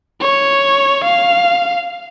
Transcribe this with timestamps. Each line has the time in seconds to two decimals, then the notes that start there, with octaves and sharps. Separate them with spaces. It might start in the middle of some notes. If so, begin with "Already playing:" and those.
0.21 C#5
1.05 F5